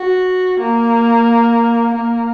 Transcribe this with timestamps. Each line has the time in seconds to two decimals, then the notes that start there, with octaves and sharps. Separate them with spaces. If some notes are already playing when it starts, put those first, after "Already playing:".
Already playing: F#4
0.60 A#3
1.95 A#3